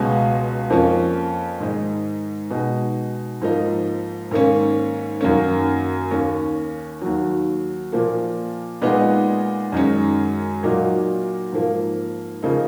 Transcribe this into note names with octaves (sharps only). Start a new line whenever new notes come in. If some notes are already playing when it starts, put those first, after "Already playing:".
Already playing: C#2 B2 G#3 C#4
F2 F3 A#3 C#4
G#2 D#3 G#3 D#4
B2 G#3 D#4
G#2 F3 A#3 D#4
G#2 D#3 A#3 C#4
F#2 D#3 A#3 C#4
D#2 D#3 A#3 C#4
D#2 D#3 F#3
A#2 F3 A#3
A#2 G#3 B3 D#4
F#2 D#3 G#3 C#4
A#2 F#3 A#3 D#4
G#2 F3 A#3
C#3 F3 A#3 D#4